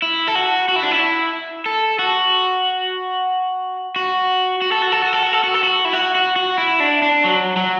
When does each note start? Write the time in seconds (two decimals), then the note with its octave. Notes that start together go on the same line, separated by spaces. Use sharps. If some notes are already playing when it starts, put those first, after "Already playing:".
0.02 E4
0.27 A4
0.35 F#4
0.68 F#4
0.76 E4
0.83 D4
0.91 E4
1.66 A4
1.99 F#4
3.96 F#4
4.62 F#4
4.72 A4
4.82 F#4
4.92 A4
5.02 F#4
5.13 A4
5.23 F#4
5.33 A4
5.44 F#4
5.54 A4
5.63 F#4
5.85 E4
5.93 F#4
6.15 F#4
6.36 F#4
6.58 E4
6.80 D4
7.02 D4
7.24 F#3
7.57 F#3